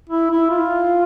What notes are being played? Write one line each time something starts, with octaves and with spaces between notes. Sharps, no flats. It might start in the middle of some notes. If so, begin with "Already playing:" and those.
E4
E4
F4